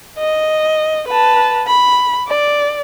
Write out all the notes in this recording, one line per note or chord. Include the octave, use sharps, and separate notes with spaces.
D#5
B4 A5
B5
D5